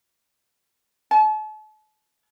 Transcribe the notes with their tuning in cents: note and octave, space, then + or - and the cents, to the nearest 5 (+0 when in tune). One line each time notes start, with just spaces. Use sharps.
A5 -40